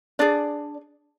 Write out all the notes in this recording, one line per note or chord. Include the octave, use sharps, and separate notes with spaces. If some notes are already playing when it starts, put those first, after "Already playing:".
D4 G#4 D5